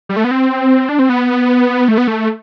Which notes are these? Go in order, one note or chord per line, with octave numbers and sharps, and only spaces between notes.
G3
A3
B3
C4
D4
C4
B3
A3
B3
A3